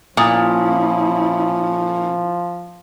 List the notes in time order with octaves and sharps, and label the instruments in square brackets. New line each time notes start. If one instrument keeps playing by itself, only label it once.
[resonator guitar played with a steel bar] A#2 [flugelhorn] F3 [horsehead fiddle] C#4 E4 [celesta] G#5 D#6